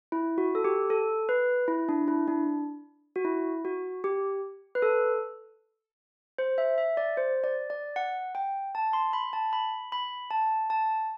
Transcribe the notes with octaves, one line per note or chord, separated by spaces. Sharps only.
E4
F#4
A4
G4
A4
B4
E4
D4
E4
D4
F#4
E4
F#4
G4
B4
A4
C5
E5
E5
D5
C5
D5
D5
F#5
G5
A5
C6
B5
A5
B5
B5
A5
A5